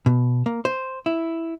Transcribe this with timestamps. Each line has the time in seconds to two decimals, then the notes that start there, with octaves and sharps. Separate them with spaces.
0.06 B2
0.46 A#3
0.65 C5
1.06 E4